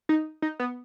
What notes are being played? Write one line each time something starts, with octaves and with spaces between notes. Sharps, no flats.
D#4
D#4
B3